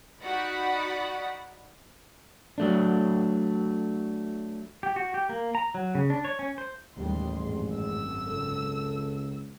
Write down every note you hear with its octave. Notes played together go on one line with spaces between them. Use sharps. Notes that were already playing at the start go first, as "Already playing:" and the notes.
D#4 F#4 D5 F#5 B5
F#3 A3 D4
G4
F#4
G4
A#3
A#5
F#3
C#3
D4
C#5
C#4
C5
A1 D#2 G3 G#3 C6
G#1 F#2 G#3
E6
C#2 A4